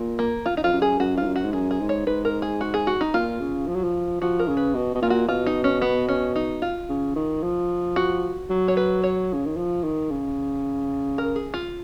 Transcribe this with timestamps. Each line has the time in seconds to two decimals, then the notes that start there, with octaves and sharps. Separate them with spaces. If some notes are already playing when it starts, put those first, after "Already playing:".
Already playing: A#2
0.19 A#3
0.46 F4
0.57 D#4
0.64 F2 F4
0.73 F#2
0.82 G#4
0.99 F#2 F#4
1.17 G#2 F4
1.26 F#2
1.36 F#4
1.44 G#2
1.53 F#2 G#4
1.71 G#4
1.80 G#2
1.89 C#5
2.07 G#2 B4
2.25 A#4
2.42 G#4
2.61 F#4
2.74 G#4
2.87 F#4
3.01 D#4
3.14 A#2 F4
3.40 C#3
3.68 F3
3.76 F#3
3.84 F3
4.21 F3 F#4
4.39 A#4
4.48 C#3
4.57 B4
4.75 B2
4.95 B2
5.02 A#2 F4
5.10 F#4
5.28 B2 F4
5.46 D#4
5.64 C#4
5.82 B3
6.09 C#4
6.36 D#4
6.62 F4
6.89 C#3
7.16 D#3
7.43 F3
7.96 F#4
8.50 F#3
8.68 C#5
8.77 B4
9.03 C#5
9.34 C#3
9.46 D#3
9.57 F3
9.84 D#3
10.11 C#3
11.18 A#4
11.36 G#4
11.54 F4